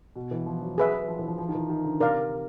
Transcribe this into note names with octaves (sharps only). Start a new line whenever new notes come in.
B2
E3
F3
F#3
G#4 B4 E5
F3
E3
F3
F3
D#3
E3
D#3
D3
C3 A#4 D5 F5